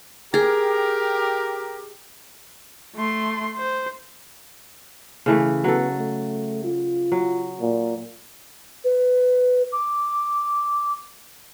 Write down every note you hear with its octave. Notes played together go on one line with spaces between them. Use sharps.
G4 G#4 A#4
A3 C6
C5
C#3 E3 A3
F#3 B3 A4
A3
F4
F#3
A#2
B4
D6